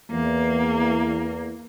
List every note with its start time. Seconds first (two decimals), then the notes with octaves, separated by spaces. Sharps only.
0.11 E2 A#3